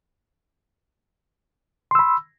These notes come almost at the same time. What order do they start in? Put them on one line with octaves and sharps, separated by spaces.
C6 E6 B5